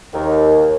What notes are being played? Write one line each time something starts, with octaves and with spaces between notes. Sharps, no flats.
D#2